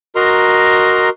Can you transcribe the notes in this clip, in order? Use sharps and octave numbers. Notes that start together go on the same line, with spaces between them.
F#4 A#4 D#5 A#5 C6